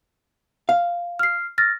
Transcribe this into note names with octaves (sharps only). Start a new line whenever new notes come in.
F5
F6 C7
F6 A6 A#6